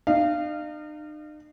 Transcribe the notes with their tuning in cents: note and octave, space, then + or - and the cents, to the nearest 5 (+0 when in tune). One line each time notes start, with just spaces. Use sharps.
D#4 -45 F5 -15